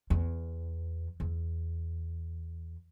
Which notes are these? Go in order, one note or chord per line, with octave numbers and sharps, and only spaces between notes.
E2
E2